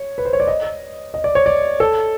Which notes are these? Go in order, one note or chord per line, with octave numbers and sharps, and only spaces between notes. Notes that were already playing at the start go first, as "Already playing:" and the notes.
Already playing: C#5
B4
C5
C#5
D5
D#5
D#5
D5
C#5
D5
A4